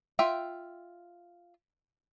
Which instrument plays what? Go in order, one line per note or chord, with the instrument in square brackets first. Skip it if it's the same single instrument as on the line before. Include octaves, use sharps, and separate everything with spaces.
[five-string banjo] F4 E5 G5